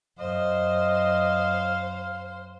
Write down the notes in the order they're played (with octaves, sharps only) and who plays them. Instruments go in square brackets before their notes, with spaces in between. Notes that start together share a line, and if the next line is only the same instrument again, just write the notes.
[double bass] F#2 [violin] C5 [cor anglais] D#5 [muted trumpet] F5